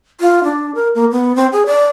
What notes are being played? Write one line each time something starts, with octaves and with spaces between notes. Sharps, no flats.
F4
D4
A#4
A#3
B3
C4
G#4
D5